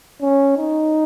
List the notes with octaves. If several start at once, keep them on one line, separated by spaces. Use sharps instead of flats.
C#4
D#4